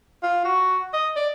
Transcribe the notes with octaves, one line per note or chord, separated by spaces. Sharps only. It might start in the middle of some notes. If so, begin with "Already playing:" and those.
F4
F#4
D#5
D5